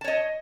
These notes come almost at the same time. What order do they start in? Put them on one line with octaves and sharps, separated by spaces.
A5 C#5 D#5